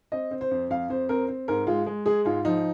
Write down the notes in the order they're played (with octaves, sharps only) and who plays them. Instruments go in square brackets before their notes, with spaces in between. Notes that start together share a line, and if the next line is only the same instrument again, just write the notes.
[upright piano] C4 D#5
C4
C5
F2
F2 F5
F2 C5
C4 A#4
C4
G#2 A#4
G#3 F4
G#3
G#3 G#4
G#2 F4
F3 D#4